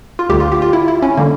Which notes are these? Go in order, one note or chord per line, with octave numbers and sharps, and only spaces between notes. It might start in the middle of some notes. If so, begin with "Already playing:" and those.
F4
D2 D3 G3 G4
F4
G4
F4
E4
E4
C#4
D3 G3 A#3